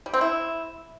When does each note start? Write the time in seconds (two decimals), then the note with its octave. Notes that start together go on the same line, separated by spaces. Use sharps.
0.06 G3
0.14 C4
0.21 E4